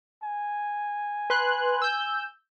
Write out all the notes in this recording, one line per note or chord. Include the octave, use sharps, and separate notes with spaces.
G#5
B4 C6 F#6
E6 G6